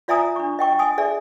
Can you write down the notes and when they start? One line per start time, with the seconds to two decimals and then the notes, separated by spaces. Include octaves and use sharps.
0.08 F4 D5 E5 G#5 A#5 D#6
0.36 D4 C#6
0.59 D#5 G5 C#6
0.79 D#5 G#5 D#6
0.98 G#4 D5 E5 G#5